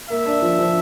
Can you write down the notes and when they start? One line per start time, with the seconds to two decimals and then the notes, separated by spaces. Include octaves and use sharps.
0.10 A#3 E5
0.26 D4
0.42 F3
0.59 F3